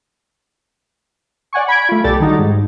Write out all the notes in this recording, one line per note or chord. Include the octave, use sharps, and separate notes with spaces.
D5 F#5 G#5 C#6
B5 G#6 D7
A3 F4
B1 G4 A4 D5 A6
D#3 G3 D#4 F#4
G#2